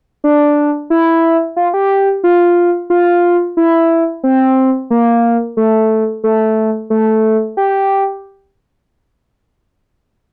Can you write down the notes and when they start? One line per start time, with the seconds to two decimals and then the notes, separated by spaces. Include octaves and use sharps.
0.24 D4
0.90 E4
1.56 F4
1.74 G4
2.24 F4
2.90 F4
3.57 E4
4.24 C4
4.90 A#3
5.57 A3
6.24 A3
6.90 A3
7.57 G4